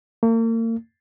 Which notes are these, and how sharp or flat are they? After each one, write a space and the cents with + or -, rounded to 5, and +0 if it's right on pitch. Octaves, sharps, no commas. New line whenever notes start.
A#3 -40